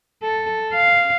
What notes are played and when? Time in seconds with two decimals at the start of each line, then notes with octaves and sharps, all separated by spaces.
0.23 A4
0.74 F5